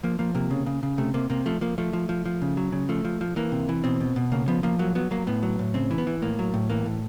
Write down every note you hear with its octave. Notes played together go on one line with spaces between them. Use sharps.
F3 A#3
F3 A#3
C3 A#3
C#3
C#3
C#3
C3 A3
C3 A#3
C3 A#3
F3 A3
F3 A#3
F3 A3
F3
F3
F3
C#3
F#3
C#3
F3 A3
F3
F3
E3 A#3
C3
E3
B2 C4
B2
B2
C#3 A#3
F3 B3
F3 A#3
F#3 A#3
F#3 B3
F#3 A#3
A2 B3
F#3
A2
C#3 C4
E3
B3
E3
A2 A#3
F#3
A2
E3 A#3
A2